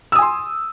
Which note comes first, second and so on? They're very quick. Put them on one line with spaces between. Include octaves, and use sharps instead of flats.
E6 D#6 G#5 C6